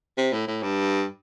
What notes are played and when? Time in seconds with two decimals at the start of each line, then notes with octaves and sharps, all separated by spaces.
0.18 C3
0.33 A2
0.48 A2
0.63 G2